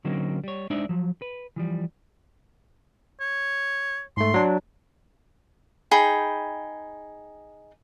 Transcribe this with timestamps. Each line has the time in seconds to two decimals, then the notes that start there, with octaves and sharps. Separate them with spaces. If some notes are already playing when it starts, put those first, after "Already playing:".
0.05 D3 F#3 A#3 C4 C#4 D#4
0.44 G3 C#5
0.70 G#3 D4 D#4 C5 D5 E5
0.89 F3 F#3
1.22 B4
1.56 E3 F3 G3
3.20 C#5
4.17 G#2 A3 C6
4.34 F#3 D4
5.91 D#4 G#4 G5 B5